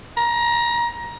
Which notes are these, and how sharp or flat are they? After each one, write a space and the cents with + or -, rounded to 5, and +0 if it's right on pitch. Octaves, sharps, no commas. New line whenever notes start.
A#5 +25